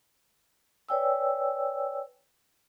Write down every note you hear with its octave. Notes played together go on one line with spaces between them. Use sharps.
B4 C#5 D5 G5 G#5 E6